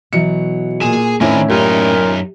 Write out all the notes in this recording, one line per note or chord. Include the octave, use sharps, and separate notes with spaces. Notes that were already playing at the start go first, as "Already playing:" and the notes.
B2 E3 F#3 C#7
A#2 G#4 G#5 E7
A2 D#3 C4 C#4 E4 A#4 D5 G#5
F#2 A#2 D#4 G4 A#4